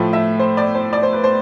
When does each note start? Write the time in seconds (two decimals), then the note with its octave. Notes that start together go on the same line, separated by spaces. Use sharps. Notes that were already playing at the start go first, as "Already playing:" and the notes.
Already playing: A2 F3 A3
0.13 E5
0.39 C5
0.57 D5
0.75 C5
0.93 D5
1.03 C5
1.13 B4
1.24 C5